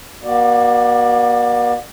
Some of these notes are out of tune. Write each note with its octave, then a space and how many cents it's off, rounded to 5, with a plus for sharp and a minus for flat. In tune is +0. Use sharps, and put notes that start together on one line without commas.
A#3 +45 F#4 +15 D5 +15